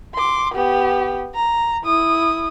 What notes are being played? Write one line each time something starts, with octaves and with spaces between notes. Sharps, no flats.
C6 D6
B3 G4
A#5
E4 D#6